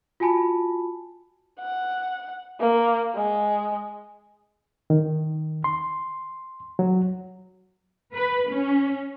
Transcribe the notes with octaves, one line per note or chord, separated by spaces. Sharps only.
F4 F#4 G#5 A5 B5
F#5
A#3
G#3
D#3
C6
F#3
B4
C#4